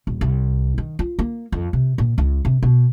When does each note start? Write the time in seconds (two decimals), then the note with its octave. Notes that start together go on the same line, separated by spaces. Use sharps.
0.07 D#1
0.21 C2
0.78 D#3
0.99 F4
1.19 A#3
1.52 F2
1.73 C3
1.98 A#2
2.18 C#2
2.45 C3
2.63 B2